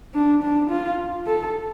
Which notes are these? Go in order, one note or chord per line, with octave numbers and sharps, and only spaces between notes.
D4
D4
F4
A4